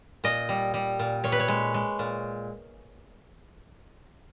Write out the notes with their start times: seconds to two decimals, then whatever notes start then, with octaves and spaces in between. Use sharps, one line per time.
0.24 A#2 D#5
0.49 G3
0.74 G3
0.99 A#2
1.24 A#2 C#5
1.32 B4
1.40 C#5
1.48 G#3
1.74 G#3
1.99 A#2